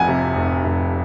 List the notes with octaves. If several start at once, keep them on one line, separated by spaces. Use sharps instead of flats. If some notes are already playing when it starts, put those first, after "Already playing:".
Already playing: F1 F2 F#5 G#5
C3
F1
F1